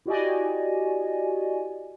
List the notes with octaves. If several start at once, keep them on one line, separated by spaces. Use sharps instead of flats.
E4 F#4 G4 D5 D#5 G#5